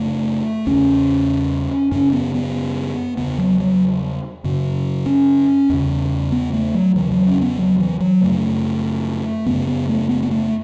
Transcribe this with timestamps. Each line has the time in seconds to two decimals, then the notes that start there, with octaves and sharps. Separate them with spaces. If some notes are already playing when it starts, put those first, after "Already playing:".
Already playing: F#2 C#3 A3
0.67 E2 C#3 C#4
1.92 F#2 C#3 C#4
2.13 B3
2.35 B3
3.17 E2 C#3 B3
3.38 F#3
3.60 F#3
4.44 F#2 C#3
5.06 C#4
5.69 E2 C#3
6.32 B3
6.53 A3
6.74 F#3
6.95 E2 C#3 E3
7.12 F#3
7.26 C#4
7.42 B3
7.58 F#3
7.79 E3
8.00 F#3
8.21 F#2 C#3 A3
9.46 F#2 C#3 B3
9.67 B3
9.89 A3
10.09 B3
10.23 B3
10.31 A3